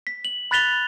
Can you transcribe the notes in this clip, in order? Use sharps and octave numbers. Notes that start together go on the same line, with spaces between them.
B6
F#7
B5 F#6 A6 B6 F7 G7